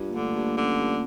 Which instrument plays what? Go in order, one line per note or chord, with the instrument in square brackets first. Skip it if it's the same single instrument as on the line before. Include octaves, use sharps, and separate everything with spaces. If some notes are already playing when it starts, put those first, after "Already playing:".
Already playing: [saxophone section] G2 [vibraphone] F4
[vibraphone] A#3
[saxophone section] D3 [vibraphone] A3
[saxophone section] G2 [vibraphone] A#3
[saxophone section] D3 [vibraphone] C#4
[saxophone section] G2